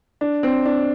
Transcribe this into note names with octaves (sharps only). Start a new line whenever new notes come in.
D4
C4
D4